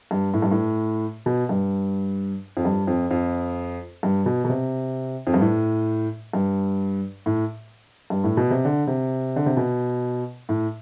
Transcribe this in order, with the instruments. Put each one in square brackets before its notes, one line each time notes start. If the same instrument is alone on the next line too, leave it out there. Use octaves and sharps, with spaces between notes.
[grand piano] G2
A2
G2
A2
B2
G2
F2
G2
F2
F2
G2
B2
B2
C3
F2
G2
A2
G2
A2
G2
A2
B2
C3
D3
C3
D3
C3
B2
A2